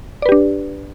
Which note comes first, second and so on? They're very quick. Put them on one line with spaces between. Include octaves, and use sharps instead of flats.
D5 B4 G4 D4